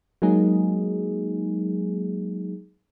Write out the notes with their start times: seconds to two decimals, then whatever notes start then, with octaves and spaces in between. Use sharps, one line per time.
0.22 F#3 G#3 A#3 D#4 G#4